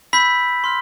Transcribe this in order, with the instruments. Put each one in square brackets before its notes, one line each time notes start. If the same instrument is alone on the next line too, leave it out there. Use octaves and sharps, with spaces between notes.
[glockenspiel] B5 E6 G6 B6
C6 F6